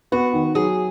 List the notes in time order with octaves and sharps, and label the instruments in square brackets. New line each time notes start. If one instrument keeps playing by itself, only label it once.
[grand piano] B3 [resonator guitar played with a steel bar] F#4
[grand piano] D#3
[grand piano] F#3 [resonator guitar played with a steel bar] G#4